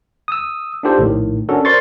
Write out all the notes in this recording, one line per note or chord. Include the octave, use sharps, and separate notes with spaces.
D#6 E6
D4 D#4 F4 G4 A4 C5
A#1 A2 D#3
C#4 D4 F#4 A4 A#4
A#4 C5 D5 C6 C#6 A6